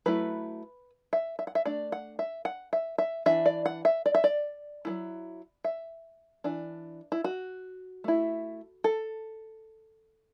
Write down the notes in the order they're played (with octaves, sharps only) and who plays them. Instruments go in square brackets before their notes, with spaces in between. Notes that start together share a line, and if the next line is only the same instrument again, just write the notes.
[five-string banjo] F#3 A3 E4 B4
E5
E5
F#5
E5
A3 D4 D5
F#5
E5
F#5
E5
E5
E3 D4 E5
D5
F#5
E5
D5
E5
D5
F#3 A3 E4
E5
E3 D4
E4
F#4
A3 E4
A4